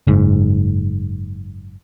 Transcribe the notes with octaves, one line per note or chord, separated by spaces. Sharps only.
F#1 G#2